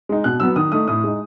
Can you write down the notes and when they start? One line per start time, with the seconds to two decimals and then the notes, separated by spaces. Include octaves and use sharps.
0.09 G#3 D#4
0.24 B2 F#6
0.40 F#3 B3 E6
0.56 D#3 D#6
0.72 A3 D#4 D#6
0.87 A2 D#6
1.04 G#3 D#4